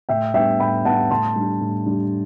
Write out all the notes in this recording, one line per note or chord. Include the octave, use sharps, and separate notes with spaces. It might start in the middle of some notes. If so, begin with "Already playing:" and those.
A2 E5 G5
G3 B3 D4 E5 G5
A2 G5 B5
G3 B3 D4 F#5 A5
A2 A5 C6
G3 D4
A2
G3 D4